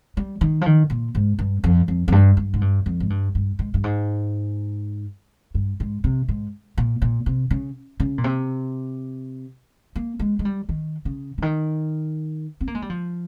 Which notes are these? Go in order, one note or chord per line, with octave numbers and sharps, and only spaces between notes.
G3
D#3
F3
D#3
A#2
G#2
G2
F2
F2
F2
G2
G2
G#2
G2
F2
G#2
G2
G2
G#2
G2
G#2
G2
G#2
C3
G#2
A#2
A#2
C3
C#3
C#3
A#2
C3
A#3
G#3
G#3
G3
D#3
C#3
C#3
D#3
C4
A#3
G#3
G3
F3